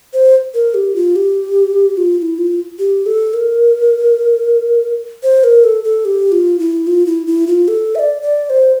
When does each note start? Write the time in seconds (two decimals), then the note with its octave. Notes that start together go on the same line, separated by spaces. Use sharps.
0.13 C5
0.54 A#4
0.74 G4
0.96 F4
1.16 G4
1.97 F4
2.18 F4
2.22 E4
2.38 F4
2.79 G4
3.06 A4
3.34 A#4
5.23 C5
5.44 A#4
5.64 A4
5.84 A4
6.05 G4
6.32 F4
6.59 E4
6.87 F4
7.06 E4
7.27 E4
7.47 F4
7.68 A4
7.95 E5
7.99 D5
8.22 D5
8.50 C5